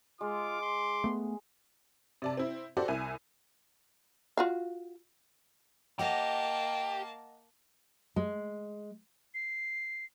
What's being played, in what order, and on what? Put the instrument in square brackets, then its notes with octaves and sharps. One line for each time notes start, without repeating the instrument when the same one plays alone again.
[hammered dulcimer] G#3 [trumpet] F4 [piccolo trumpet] D6
[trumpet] C6
[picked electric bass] A3 B3
[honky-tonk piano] C3 D5 A5
C4 E4
F#4 G4 A4 C5 D5
C2 E5 G#5
[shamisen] F4 F#4 F5
[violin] A#3 A5 [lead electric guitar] G4 [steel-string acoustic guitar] D#5 F#5
[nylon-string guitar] G#3
[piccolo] C7